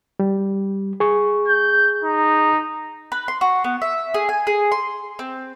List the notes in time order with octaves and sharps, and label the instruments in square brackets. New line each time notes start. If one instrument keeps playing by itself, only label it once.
[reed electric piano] G3
G#4 C#6
[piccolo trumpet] G6
D#4
[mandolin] B4
C6
F#4
B3
E5
G#4
G#5
G#4
C6
C4